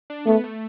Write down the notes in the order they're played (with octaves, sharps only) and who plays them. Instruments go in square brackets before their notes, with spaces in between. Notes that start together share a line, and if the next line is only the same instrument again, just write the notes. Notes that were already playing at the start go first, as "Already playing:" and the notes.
[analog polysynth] D4
[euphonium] A3 [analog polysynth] B3
[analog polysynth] A3